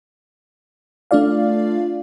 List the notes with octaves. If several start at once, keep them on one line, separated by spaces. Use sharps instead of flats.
A3 D4 F4 D5 F5